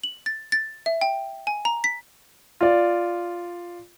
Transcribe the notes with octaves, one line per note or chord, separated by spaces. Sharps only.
F#7
A6
A6
E5
G5
G#5
A#5
B6
F4 D5